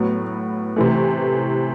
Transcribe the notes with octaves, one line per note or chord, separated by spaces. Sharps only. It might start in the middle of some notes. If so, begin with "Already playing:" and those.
Already playing: A2 F#3 B3
C3 E3 A3